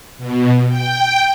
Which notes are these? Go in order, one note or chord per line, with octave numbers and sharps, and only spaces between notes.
B2
G5